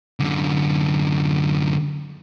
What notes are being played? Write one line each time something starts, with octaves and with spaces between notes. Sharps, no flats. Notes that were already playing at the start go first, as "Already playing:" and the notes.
F#2 D3